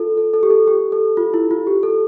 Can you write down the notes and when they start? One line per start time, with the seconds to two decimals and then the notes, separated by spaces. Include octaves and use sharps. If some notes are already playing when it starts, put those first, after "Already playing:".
Already playing: F4 A4
0.17 A4
0.34 A4
0.43 G4
0.50 A4
0.67 G4
0.92 A4
1.17 F4
1.34 E4
1.51 F4
1.67 G4
1.83 A4